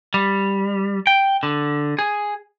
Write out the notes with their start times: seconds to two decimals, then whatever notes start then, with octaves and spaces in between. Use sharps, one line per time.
0.14 G3
1.07 G5
1.43 D3
1.99 G#4